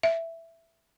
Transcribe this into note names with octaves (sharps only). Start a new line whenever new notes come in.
E5